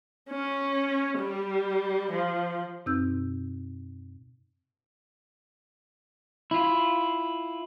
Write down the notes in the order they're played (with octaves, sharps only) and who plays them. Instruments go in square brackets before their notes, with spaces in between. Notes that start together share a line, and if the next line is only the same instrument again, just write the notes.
[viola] C#4
G3
F3
[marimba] F#2 B2 C4 D#4 E6 G6
[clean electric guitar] E4 F4